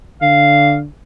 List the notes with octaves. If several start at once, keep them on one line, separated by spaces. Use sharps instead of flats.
D3 F5